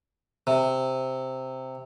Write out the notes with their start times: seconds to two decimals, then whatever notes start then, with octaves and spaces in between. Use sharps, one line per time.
0.47 C3